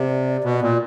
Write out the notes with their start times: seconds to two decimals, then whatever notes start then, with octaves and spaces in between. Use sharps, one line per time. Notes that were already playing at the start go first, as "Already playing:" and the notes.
Already playing: C3 D5
0.44 B2
0.62 A#2